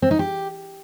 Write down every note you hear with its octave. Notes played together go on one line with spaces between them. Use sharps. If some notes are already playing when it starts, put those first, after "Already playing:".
C4
D#4
G4